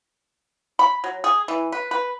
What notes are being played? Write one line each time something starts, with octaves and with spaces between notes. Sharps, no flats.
B5
F#3
G#4
E3
B4
B4